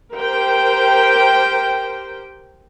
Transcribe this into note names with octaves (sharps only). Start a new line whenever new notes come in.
G4 A#4 C5 G5